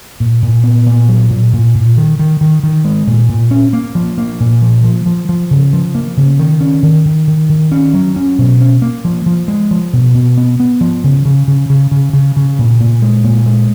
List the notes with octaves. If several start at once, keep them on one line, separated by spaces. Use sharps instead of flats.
A#2
A#2
B3
A#2
F#3
A#2
A#2
A#2
D#3
D#3
D#3
D#3
G#3
A#2
A#2
C#4
A#3
F3
A#3
A#2
F3
F3
F3
F3
C#3
F3
A#3
C#3
D#3
C#4
D#3
D#3
D#3
D#3
C#4
F#3
C#4
B2
C#4
A#3
F3
F3
G#3
F3
B2
B2
B3
B3
F3
C#3
C#3
C#3
C#3
C#3
C#3
C#3
A#2
A#2
G#3
A#2
G#3